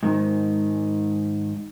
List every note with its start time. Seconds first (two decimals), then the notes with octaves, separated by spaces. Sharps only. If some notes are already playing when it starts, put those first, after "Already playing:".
0.03 G#2 D#3